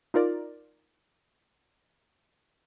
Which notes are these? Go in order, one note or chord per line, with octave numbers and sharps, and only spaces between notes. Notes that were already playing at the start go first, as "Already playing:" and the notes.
D#4 F4 A#4 D5